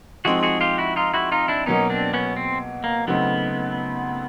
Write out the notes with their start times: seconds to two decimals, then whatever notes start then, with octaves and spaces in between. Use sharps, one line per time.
0.25 F3 G#3 C4 D#4 F#4 G#4
0.43 F#4 G#4
0.61 F4 G4
0.78 E4 F#4
0.96 D#4 F4
1.14 E4 F#4
1.32 D#4 F4
1.48 D4 E4
1.66 B2 F#3 A#3 C#4 D#4
1.90 C4 D4
2.13 B3 C#4
2.36 C4
2.84 A#3
3.07 C#3 F#3 A3 B3 C4 D#4